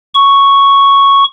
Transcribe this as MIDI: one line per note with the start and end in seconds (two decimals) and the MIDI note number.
0.15 1.24 85